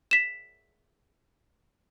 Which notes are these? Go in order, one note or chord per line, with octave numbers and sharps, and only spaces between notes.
B6 E7